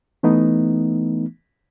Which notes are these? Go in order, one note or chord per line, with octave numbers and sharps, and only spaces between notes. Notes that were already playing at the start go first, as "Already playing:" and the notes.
E3 A3 B3 D#4